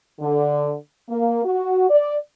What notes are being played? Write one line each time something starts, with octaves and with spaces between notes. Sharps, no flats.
D3
A#3
F#4
D5